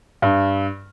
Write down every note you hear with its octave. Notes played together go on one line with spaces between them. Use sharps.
G2